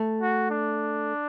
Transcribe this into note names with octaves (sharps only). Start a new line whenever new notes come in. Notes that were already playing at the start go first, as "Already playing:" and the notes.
Already playing: A3
F#4
D4